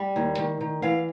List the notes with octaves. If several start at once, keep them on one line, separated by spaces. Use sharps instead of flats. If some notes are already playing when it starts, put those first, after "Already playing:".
Already playing: G3 G5
D#2
D#3
D#3
E3 F5